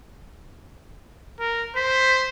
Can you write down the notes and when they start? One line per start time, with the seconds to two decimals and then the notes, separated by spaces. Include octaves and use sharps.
1.40 A#4
1.76 C5 B6